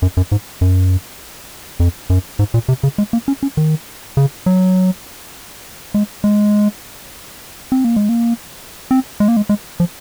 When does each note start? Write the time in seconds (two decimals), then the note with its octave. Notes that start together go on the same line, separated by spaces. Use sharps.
0.02 F#2
0.17 F#2
0.32 G#2
0.61 F#2
1.80 F2
2.10 F#2
2.39 G#2
2.54 A#2
2.68 C3
2.83 C#3
2.98 G#3
3.13 A#3
3.28 C#4
3.43 C#4
3.57 D#3
4.17 C#3
4.46 F#3
5.94 G#3
6.24 G#3
7.72 C4
7.84 A#3
7.96 G#3
8.09 A#3
8.91 C4
9.20 G#3
9.28 A#3
9.37 G#3
9.49 G#3
9.80 F3